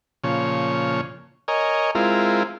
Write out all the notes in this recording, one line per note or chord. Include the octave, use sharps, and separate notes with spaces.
A#2 C#3 F3 C#5
A#4 C#5 D#5 G#5
G#3 C4 E4 F4 A#4